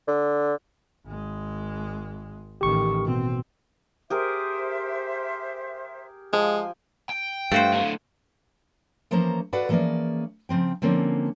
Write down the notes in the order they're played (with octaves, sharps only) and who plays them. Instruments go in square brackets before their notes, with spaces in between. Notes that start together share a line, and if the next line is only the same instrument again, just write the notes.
[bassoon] D3
[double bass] G#1 G#3
[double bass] A1 D#3 [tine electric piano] G4 C#6
[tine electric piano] B2 [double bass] C4
[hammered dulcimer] G4 G#4 A#4 [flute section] C5 E5
[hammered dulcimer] F3 G5 G#5 [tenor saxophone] G#3 [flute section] F5
[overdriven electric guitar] G5
[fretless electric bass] G2 [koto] A3 F#4 C5 [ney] F5
[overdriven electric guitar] A2 D3
[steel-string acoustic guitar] E3 F3 A#3 C#4 C5 A#5
F#4 A4 B4 D5 F5 F#5
E3 F3 A#3 C#4 G#4 D5
C#3 F3 C4 G5
D3 F3 A#3 C4 C#4